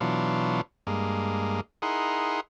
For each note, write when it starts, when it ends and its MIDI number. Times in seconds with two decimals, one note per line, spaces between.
0.01 0.61 47
0.01 0.61 52
0.01 0.61 54
0.01 0.61 62
0.01 0.61 65
0.87 1.61 43
0.87 1.61 56
0.87 1.61 58
1.82 2.40 63
1.82 2.40 64
1.82 2.40 68
1.82 2.40 70
1.82 2.40 78
1.82 2.40 84